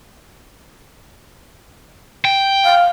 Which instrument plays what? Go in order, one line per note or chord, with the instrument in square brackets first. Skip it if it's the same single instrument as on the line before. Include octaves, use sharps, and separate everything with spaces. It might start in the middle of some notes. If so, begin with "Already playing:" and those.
[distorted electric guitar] G5
[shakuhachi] F5